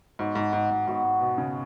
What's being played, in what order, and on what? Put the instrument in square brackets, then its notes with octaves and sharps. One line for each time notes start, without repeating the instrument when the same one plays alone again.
[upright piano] G#2 [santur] B3 F#4 C#5
[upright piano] G#2
G#2
G#2
[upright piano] G#2 [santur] B3 F#4 C#5
[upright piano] G#2
B2
C#3